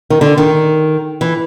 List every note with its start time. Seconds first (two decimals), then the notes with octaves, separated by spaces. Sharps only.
0.10 D#3
0.21 D3
0.38 D#3
1.21 E3